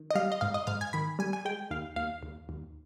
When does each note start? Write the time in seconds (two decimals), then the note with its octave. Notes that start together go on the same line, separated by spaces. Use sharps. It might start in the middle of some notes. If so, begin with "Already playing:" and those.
Already playing: D#3
0.11 D#5
0.15 G3 F5
0.32 D#5
0.41 G#2 F5
0.54 D#5
0.67 G#2 F5
0.81 G#5
0.93 D#3 B5
1.19 G3 G#5
1.33 G#5
1.45 G#3 G5
1.70 D#2 F5
1.96 D#2 F5
2.23 D#2
2.49 D#2